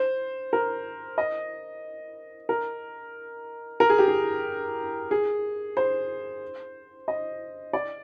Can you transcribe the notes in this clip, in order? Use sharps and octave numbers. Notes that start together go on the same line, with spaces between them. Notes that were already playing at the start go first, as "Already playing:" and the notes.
Already playing: C5
A#4
D#5
A#4
A#4
G#4
G4
G#4
G#4
C5
D#5
D5